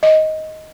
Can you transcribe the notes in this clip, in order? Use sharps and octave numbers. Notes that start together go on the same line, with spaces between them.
D#5